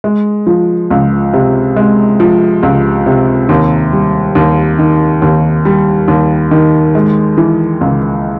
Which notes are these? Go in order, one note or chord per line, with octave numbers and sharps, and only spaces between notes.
G#3
F3
C#2
C3
G#3
F3
C#2
C3
D#2
G3
D#2
D#3
D#2
G3
D#2
D#3
G#3
E3
C#2